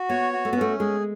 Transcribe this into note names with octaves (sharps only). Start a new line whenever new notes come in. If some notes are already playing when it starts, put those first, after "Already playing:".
Already playing: F#4
B3 C#5
F#4
A3
B3
A3 C#4
G#3 G#4